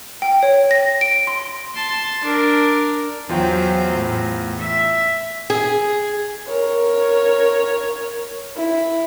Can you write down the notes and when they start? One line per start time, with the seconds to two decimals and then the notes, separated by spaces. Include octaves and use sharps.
0.22 G5
0.43 C#5
0.71 A#6
1.01 D7
1.27 C6
1.74 A5 C6
2.24 D4 A#4
3.29 E2 F#3 F4 C5 G5
3.94 A2
4.60 E5
5.50 G#4
6.48 A#4 C#5
8.57 E4